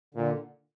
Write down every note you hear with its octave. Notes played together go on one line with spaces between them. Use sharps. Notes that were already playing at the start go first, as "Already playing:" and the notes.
A#2 D3